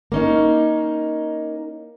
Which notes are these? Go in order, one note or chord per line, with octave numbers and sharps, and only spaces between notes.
A#3 C#4 D#4